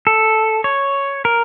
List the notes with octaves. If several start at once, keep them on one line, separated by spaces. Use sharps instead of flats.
A4
C#5
A#4